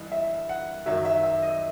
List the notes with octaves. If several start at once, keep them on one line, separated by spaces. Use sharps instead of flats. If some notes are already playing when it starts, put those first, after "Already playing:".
Already playing: G2 E3 D#5
E5
F#5
F#2 D#3 F#3 E5
E5
E5
D#5